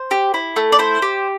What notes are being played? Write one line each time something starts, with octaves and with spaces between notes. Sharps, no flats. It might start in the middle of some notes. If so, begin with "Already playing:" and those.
Already playing: C5
G4
E4
A3
D5
E4 C5
G4